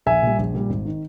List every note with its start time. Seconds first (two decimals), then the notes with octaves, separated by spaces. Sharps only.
0.06 A#1 E5 G#5
0.22 A#2 G3
0.38 A#1
0.54 A#2 G3
0.70 G#1
0.85 D#3